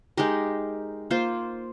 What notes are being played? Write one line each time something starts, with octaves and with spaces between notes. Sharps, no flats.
G#3 D#4 G4 A#4
A#3 F4 C5